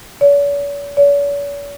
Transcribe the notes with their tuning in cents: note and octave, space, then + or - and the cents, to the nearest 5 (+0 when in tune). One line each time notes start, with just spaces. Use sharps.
C#5 +45
C#5 +45